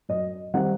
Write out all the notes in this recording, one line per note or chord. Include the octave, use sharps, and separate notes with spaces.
F#2 D#5
D#3 G3 C4 D#4 F#5